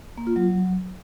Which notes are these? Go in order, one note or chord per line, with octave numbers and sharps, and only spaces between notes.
A#3
F4
F#3